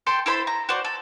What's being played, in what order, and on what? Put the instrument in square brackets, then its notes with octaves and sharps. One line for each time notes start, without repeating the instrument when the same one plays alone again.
[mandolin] A4 G5 C6
E4 A4 C5 B5
A#5
F#4 C5 D5
A4